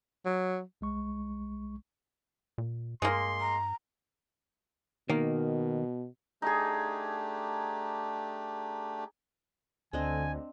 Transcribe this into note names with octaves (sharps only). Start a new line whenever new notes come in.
F#3
B1 G#3 C#6
A#2
G2 G#3 A#3 C6
A#5
B2 D#3 A#3
A3 D4 D#4 G4 G#4
D2 D3 C4 D4 D#5 G#5